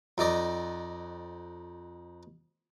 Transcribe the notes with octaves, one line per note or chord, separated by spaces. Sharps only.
F2 D#4 D5 D#5